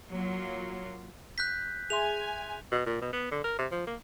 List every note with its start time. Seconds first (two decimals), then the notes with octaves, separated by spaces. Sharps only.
0.10 F#3 A#3 F4
1.38 F#6 G6 B6
1.90 G#4 E5 G#5 C6 F7
2.72 B2
2.86 A#2
3.02 B2
3.13 B3
3.32 D3
3.44 A#4
3.59 C3
3.72 F3
3.87 A#3